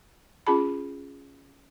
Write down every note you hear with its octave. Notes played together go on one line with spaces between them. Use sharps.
C#4 F4 G#4 A5 B5